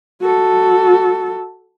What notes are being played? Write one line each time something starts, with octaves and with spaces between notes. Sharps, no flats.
F#4 A4